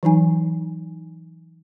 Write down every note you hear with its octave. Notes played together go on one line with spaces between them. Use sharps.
E3 F#3 D#4 G#5